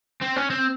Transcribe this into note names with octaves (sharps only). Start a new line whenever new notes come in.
C4
C#4
C4